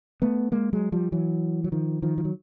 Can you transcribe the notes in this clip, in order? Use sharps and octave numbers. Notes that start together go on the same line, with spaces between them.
A3 B3
G#3 A#3
F#3 G#3
F3 G3
E3 F#3
F#3
D#3 F3
D#3 F3
F3
F#3